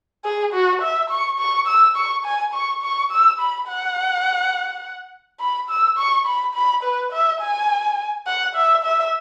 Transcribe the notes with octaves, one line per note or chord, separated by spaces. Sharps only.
G#4
F#4
E5
C#6
C#6
E6
C#6
G#5
C#6
C#6
E6
B5
F#5
B5
E6
C#6
B5
B5
B4
E5
G#5
F#5
E5
E5